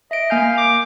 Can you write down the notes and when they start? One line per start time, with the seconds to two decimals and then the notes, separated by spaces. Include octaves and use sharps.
0.11 D#5 E5 D7
0.30 A#3 F5 G#5 G6
0.57 D6